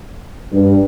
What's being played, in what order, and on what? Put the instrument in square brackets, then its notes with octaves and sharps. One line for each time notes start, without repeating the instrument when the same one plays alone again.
[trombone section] G2